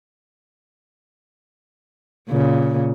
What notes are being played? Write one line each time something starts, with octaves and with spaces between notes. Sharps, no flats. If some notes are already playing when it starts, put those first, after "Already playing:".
A#2 C#3